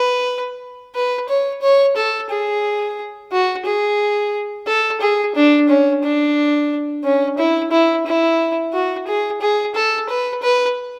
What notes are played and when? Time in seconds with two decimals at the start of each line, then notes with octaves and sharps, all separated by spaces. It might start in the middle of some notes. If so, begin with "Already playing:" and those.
Already playing: B4
0.95 B4
1.29 C#5
1.62 C#5
1.97 A4
2.30 G#4
3.32 F#4
3.66 G#4
4.67 A4
5.01 G#4
5.35 D4
5.69 C#4
6.03 D4
7.04 C#4
7.38 E4
7.72 E4
8.06 E4
8.73 F#4
9.07 G#4
9.41 G#4
9.75 A4
10.09 B4
10.43 B4